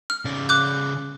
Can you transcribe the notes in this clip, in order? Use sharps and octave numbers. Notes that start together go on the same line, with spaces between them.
F6
C#3 D5
D6 F#6 G6